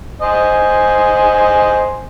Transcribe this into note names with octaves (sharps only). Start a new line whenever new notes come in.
C5 D#5 G#5